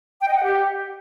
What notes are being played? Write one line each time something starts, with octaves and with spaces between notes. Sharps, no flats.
G5
D#5
F#5
G4